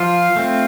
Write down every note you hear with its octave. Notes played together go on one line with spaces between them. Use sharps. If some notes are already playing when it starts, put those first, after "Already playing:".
Already playing: F3 F4
A3 C4